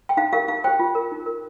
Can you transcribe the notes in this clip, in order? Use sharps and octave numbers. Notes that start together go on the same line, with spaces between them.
G5
D#4 F5
G4 A#4 F5
D#4 F5
G4 C5 G5
F4
A#4
D#4
A#4